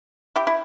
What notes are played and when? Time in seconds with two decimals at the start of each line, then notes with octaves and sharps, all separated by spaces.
0.36 E4 G4
0.47 E4